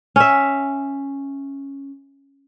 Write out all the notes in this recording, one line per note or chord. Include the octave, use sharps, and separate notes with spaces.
C#4 E5